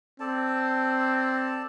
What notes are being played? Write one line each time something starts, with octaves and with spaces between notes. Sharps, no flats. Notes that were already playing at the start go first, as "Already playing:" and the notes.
C4 A4 D5 A5